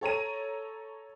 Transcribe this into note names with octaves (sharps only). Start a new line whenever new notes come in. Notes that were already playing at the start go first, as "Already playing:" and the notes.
A4 C#5 A#5 D#7